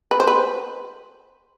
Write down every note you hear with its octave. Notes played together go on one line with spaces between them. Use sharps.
B4
C5
B4